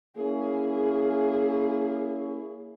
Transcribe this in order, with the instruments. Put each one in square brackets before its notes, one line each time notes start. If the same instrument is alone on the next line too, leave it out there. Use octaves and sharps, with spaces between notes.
[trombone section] A#3 C#4 E4 [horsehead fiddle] G#4